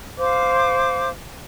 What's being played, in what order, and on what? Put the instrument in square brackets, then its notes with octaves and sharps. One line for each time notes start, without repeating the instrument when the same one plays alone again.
[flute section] C5 F5 D6